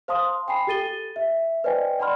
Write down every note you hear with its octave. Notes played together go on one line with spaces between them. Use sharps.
C5 F5 A5 C6 D#6
G5 G#5 B5 C7
G4 A4 A6 D#7 G7
E5
B4 C5 D5 D#5 G5 G#5
D5 F#5 A5 B5 C6 F6